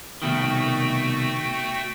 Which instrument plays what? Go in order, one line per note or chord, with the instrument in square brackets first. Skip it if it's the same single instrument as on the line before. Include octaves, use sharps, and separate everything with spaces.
[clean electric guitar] C2 B2 D#3 [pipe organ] A3 F#4 G5